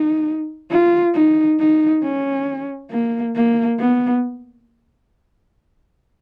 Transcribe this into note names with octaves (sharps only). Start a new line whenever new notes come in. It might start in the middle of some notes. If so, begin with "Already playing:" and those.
Already playing: D#4
F4
D#4
D#4
C#4
A#3
A#3
B3